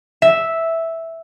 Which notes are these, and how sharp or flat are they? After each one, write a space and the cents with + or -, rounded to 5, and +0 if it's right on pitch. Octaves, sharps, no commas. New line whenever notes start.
E5 -5